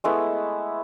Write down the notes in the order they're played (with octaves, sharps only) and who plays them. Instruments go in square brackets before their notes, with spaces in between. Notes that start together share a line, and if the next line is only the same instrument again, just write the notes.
[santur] G#3 A3 B3 E4